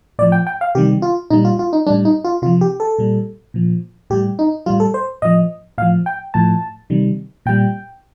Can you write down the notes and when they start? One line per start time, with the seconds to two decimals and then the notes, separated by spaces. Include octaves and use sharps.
0.19 A2 D5
0.22 F3
0.32 G5
0.47 G5
0.61 F5
0.75 C3 D#3 G3 G4
1.02 F4
1.30 A#2 G3 D#4
1.45 F4
1.59 F4
1.73 D#4
1.87 A2 G3 D4
2.05 D#4
2.25 F4
2.42 C3 F4
2.46 F3
2.61 G4
2.80 A4
2.99 A#2 G3
3.54 A#2 F3
4.10 A2 G3 G4
4.39 D#4
4.66 A2 G3 F4
4.80 A4
4.94 C5
5.22 A2 F3 D#5
5.78 A2 F5
5.82 F3
6.06 G5
6.34 A2 F3 A5
6.90 C3 D#3 G3
7.46 A#2 G3 G5